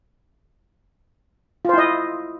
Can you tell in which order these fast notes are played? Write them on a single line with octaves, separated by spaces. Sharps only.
F4 C5 E4 D#5